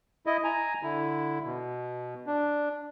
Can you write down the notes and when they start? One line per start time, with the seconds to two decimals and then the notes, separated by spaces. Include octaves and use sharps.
0.26 E4 D#5
0.44 G#5 A#5
0.83 D3 E4
1.45 B2
2.27 D4